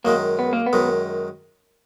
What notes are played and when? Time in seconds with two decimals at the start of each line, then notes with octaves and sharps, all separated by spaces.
0.05 F#2 D#3 G#3 A#3
0.39 B3
0.53 A#3
0.66 B3
0.73 F#2 D#3 G#3